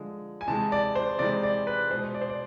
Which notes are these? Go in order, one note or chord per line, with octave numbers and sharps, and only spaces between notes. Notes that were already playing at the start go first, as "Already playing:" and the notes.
Already playing: D3 F3 G#3
G#5
C3 E3 G#3 A5
D5
C5
C3 E3 G#3 D5
D5
B4
B2 G#3 C5
D5
C5
D5